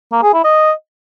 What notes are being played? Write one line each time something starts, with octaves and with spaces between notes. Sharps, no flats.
A#3
G#4
E4
D#5